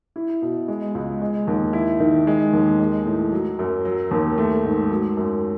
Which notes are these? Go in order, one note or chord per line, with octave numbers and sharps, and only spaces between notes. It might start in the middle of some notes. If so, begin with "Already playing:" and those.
E4
B2
G#3
C#2
G#3
D#2
E4
D#3
G#3
D#2
G#3
A2
F#3
F#2
F#3
D#2
A3
G#2
F#3
F#2